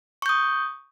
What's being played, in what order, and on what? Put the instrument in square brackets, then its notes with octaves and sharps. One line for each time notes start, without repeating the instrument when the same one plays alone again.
[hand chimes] C#6
G6
D#6